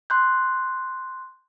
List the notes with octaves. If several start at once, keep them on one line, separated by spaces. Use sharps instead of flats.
C6 F#6 G6